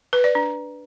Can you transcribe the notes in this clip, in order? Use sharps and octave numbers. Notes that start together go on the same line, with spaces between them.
B4
D5
D4